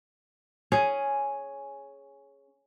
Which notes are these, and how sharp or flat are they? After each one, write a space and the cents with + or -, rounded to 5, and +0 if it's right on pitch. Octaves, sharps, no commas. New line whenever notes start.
C#4 +0 G#4 +5